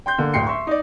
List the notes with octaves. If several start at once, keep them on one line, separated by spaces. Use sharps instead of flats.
G5 C6 G6
D3 A#3
D1 D2 G5 C6 C7 C#7
E5 C6 C#6
D#4 D5